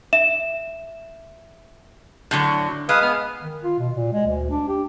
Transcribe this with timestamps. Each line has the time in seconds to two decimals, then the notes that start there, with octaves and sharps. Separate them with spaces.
0.13 E5 E7
2.31 A2 D3 F#3
2.89 G#3 B4 F5 D#6
3.02 B3 F6
3.42 D#3
3.63 F4
3.79 B2
3.95 A#2
4.13 G#3
4.27 D2
4.50 D4
4.68 G4